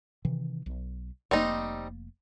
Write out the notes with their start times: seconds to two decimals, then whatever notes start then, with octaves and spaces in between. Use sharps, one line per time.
0.25 C3 D#3 E3
0.66 B1
1.31 F1 G3 A#3 C4 D#4